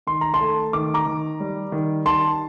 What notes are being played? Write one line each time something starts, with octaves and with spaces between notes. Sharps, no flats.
D#3 C6
A#5
A5 C6
A3
D#3 D6
A#5 D6
D#3
G3
D#3
D#3 A5 C6